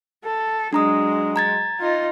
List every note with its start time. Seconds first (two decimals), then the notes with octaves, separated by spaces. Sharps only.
0.24 A4
0.73 F#3 G#3 D4 A#5 D#6
1.36 A#5 G#6 A6
1.80 D#4 F4